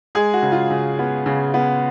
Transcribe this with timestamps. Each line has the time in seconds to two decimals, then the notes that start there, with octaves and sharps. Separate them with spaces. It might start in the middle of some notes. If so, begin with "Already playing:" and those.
0.15 G#3 G#4
0.33 F#4
0.43 C#3
0.52 F4
0.70 C#3
0.99 B3
1.26 C#3
1.54 B3